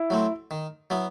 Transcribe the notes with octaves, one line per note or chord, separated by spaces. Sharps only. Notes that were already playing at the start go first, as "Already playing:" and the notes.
Already playing: E4
F#3 A3 C4
D#3
F#3 B3 E4